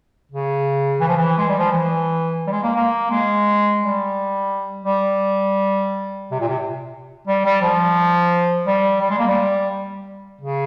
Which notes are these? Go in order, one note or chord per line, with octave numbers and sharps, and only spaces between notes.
C#3
E3
F3
E3
G#3
G3
F3
E3
G3
G#3
A#3
A#3
G#3
G3
G3
C3
A#2
C3
G3
G3
F3
G3
G3
G#3
A#3
G3
C#3